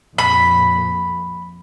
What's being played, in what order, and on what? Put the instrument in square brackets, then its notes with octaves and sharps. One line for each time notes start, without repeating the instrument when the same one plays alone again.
[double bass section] F2 A#2 [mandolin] B5